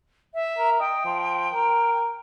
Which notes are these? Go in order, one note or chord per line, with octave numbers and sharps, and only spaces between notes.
E5
A#4
D#5 G5
F3
A#4